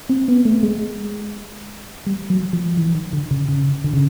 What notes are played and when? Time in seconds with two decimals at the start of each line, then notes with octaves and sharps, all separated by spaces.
0.09 C4
0.28 B3
0.45 A3
0.63 G#3
2.07 G3
2.30 F#3
2.53 F3
2.77 E3
2.95 D#3
3.13 D3
3.31 C#3
3.49 C#3
3.84 D3
3.94 C#3